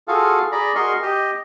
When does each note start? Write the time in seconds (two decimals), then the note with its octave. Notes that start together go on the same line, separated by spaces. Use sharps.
0.08 F4 F#4 G#4 A4 F5
0.52 G#4 D5 A#5 B5
0.75 F#4 G#4 A#4 D#5 C6 C#6
1.02 G4 D#5